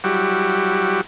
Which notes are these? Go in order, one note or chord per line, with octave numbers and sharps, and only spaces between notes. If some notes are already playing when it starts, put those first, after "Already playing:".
F#3 G3 E4 F#4 G4